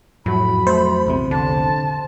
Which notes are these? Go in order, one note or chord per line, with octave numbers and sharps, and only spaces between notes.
F2 A2 F#3 B5
A3 C5
A#1 E2 C3
D3 A5